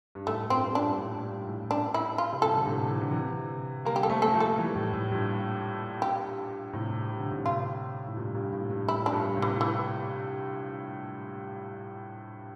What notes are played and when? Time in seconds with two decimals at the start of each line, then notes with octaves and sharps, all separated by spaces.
0.15 G2
0.27 A2 A3
0.50 G2 A#2 C4
0.74 G2 A#2 D4
0.98 A2
1.23 G2
1.42 A#2
1.47 A2
1.71 D4
1.94 E4
2.18 F4
2.33 C3
2.42 G2 A#2 A4
2.57 D3
2.66 A2 C3
2.90 E3
3.01 D3
3.11 C3 E3
3.85 G3 A#3 A#4
3.96 G4
4.03 A4
4.10 A3 C4
4.22 A4
4.27 A#3
4.34 F3 A3
4.40 A4
4.58 E3 G3
4.76 A2
4.93 A2
5.12 G2 A#2
6.02 G4
6.73 A2 C3
7.09 C3
7.20 D3
7.31 A2 C3
7.46 F4
8.08 A2
8.17 G2 A#2
8.35 G2 A#2
8.53 A2
8.71 G2
8.88 A2 E4
9.06 D4
9.12 G2 A#2
9.36 A2 C3
9.42 E3
9.61 E3